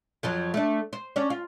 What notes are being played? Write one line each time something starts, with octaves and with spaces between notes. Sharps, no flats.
F2 F3 F#3
A3 D4
C5
C#4 D4
F4